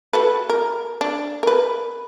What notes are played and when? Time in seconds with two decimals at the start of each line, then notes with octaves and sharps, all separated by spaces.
0.13 F#4 A4 B4
0.50 A#4
1.01 D4
1.43 A#4 B4